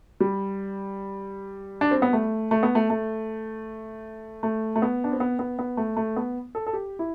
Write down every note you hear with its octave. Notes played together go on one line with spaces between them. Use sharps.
G3
D4
C4
B3
A3
A3
B3
A3
A3
A3
A3
B3
D4
C4
B3
B3
B3
A3
A3
B3
A4
A4
G4
E4